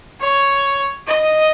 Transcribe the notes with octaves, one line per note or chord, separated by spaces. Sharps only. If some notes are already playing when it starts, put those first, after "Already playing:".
C#5
D#5